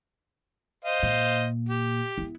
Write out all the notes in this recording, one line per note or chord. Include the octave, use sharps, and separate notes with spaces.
C5 D#5 F5
A#2
G4
B3 E4